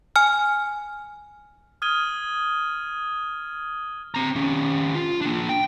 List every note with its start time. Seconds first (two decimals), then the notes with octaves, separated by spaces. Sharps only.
0.16 G#5 F6
1.82 D#6 F6 G#6 D#7 G7
4.15 C4 A#5
4.36 D#3 C#4
4.95 F4
5.21 A#3 D4
5.49 G5